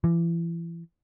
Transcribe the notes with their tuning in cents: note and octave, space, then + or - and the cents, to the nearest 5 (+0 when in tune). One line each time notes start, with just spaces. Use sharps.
E3 +35